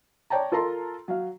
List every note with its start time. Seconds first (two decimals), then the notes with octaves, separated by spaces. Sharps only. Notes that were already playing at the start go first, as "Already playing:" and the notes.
0.30 C#5 D5 G5 A5 A#5
0.52 F4 A4 A#4 A#5 C6
1.08 F#3 F5